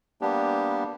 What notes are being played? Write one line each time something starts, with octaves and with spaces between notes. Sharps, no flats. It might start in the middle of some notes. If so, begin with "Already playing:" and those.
G3 A#3 B3 D4 G4